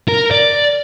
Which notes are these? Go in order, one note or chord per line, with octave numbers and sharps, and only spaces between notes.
A#4
D5